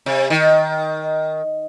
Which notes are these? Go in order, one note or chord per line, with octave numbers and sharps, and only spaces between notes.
C3
D#3